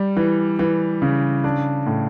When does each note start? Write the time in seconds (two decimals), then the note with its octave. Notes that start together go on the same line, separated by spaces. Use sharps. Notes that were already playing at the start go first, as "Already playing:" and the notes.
Already playing: G3
0.17 E3
0.59 E3
1.02 C#3
1.44 D4
1.86 A2